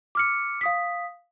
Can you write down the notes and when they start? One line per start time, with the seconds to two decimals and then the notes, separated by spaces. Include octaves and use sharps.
0.15 D6 F6 C#7
0.61 F5 D#6 B6